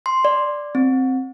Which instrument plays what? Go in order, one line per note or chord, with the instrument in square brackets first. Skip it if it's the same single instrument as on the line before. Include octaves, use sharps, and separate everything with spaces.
[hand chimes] C6
D5
C4